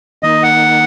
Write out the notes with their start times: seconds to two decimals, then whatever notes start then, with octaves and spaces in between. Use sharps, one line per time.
0.23 D#3 A#3 D#4 D#5
0.43 F#5